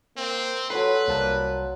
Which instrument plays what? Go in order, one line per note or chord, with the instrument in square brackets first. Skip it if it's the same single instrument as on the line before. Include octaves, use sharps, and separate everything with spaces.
[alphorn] A#3 [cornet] C4
[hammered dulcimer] F#3 C6 [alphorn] A4 [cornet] B4 [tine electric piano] C#5 C7
[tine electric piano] C2 A5 F#6 [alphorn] A#3